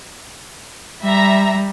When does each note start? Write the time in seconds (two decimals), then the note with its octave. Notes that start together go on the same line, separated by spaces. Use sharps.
1.03 G3 E5 A#5